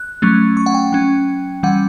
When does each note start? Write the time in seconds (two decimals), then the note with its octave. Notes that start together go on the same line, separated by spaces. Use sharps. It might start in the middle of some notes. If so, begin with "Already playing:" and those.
Already playing: F#6
0.22 F#3 A3 C#4
0.57 C#6
0.66 F#5
0.74 G5
0.92 F#3 C#4
1.63 E3 G3 C#4 F#5